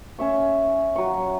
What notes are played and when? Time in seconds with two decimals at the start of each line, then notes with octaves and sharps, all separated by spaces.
0.18 C#4 E5 C#6
0.96 F#3 C#6